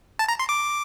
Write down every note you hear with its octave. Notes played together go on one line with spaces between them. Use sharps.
A5
A#5
C6
D6